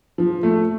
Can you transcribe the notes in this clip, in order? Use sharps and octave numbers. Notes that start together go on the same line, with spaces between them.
F3
A3